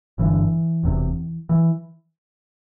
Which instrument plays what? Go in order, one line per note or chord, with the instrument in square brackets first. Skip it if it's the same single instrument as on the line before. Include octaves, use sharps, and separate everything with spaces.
[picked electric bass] G1 G2 D3 E3
E1 E2 C3
E3